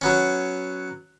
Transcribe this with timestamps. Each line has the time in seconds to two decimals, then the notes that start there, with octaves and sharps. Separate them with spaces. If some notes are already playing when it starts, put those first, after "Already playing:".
0.01 F#3 B3 C#4